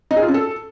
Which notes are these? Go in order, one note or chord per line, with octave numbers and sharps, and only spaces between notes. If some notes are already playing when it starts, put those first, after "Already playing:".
D#4
G#4
F4
C#4
A4